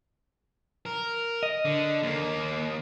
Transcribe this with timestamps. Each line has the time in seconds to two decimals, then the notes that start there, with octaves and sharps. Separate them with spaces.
0.86 A#4
1.43 D#5
1.65 D3
2.03 D#2 A#3